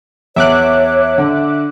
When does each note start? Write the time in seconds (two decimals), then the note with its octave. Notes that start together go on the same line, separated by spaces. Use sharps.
0.36 E2 C#5 E5 D6 F#6
1.18 D3